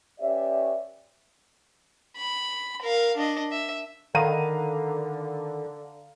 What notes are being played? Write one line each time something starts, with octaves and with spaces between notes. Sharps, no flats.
C#4 G4 B4 C#5 D5 E5
B5
A#4 F5
D4 D#5
E5
D3 D#3 A4 F5 F#5 A#5 B5 D#7